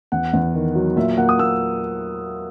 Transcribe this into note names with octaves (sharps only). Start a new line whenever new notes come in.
E2 F#5
E2
D#3
F#3
A#2 E5
A#3 F#5
D#6
A#3 E6